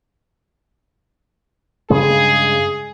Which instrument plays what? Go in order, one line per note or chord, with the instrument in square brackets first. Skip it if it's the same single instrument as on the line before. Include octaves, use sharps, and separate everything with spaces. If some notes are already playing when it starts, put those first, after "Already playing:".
[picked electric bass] G2 C#3 G#3 [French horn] G#4